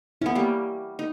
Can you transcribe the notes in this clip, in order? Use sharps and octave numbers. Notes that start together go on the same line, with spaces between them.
B3 C#4 E4
G3 A#3
D#4